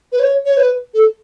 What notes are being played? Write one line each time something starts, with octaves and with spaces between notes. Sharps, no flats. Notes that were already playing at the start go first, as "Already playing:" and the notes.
B4
C#5
C#5
B4
A4